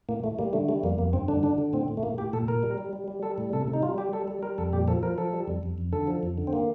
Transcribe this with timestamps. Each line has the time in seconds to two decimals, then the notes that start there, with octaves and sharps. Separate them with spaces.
0.09 A2 A#3
0.24 A2 A3
0.39 G3 A#3
0.53 D3 A3
0.68 G3 A3
0.83 F2 A#3
0.98 F2 A#3
1.13 G2 C4
1.28 D3 D4
1.43 D3 D4
1.58 D3
1.73 A2 C4
1.88 A2
1.97 A3
2.03 A2 A#3
2.18 A2 G4
2.33 A#2 A4
2.48 A#2 A#4
2.63 G3
2.78 G3
2.93 G3
3.08 G3
3.23 G3 A4
3.38 A2
3.53 C3 A4
3.68 C3
3.73 D#4
3.83 G3 F4
3.98 G3 G4
4.13 G3 A4
4.28 G3
4.43 G3 A#4
4.58 F2 A4
4.73 A#2 G4
4.88 F3 A4
5.03 F3 A#4
5.18 F3 A4
5.33 G3
5.48 F2
5.63 F2
5.78 F2
5.93 D3 A4
6.07 F3
6.23 F2
6.38 D3
6.47 C4
6.53 A#3